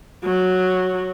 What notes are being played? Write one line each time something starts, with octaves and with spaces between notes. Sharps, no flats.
F#3